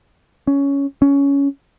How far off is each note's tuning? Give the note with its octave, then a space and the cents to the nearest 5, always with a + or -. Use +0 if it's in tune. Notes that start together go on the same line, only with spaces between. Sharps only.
C#4 +10
C#4 +15